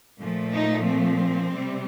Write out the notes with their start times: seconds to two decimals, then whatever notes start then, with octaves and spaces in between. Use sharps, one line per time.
0.20 A#2 F3 A3
0.53 D#4
0.86 C4
1.52 C3 G3